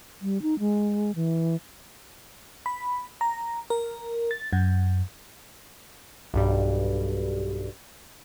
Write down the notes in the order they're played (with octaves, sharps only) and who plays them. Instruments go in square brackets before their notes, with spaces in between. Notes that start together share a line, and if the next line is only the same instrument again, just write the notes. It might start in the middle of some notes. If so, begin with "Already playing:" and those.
[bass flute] G3
D#4
G#3
E3
[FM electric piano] B5
A#5
A#4
A6
F#2
[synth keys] B1 G2 G3